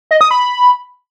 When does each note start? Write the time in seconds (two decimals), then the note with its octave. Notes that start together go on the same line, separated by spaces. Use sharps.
0.11 D#5
0.21 D#6
0.31 B5